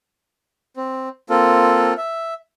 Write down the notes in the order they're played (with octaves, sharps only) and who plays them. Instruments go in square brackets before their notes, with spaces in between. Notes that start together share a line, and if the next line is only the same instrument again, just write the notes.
[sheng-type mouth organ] C4
A#3 C4 F4 A4
E5